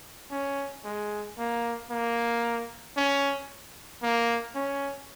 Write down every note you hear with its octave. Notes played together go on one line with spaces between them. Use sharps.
C#4
G#3
A#3
A#3
C#4
A#3
C#4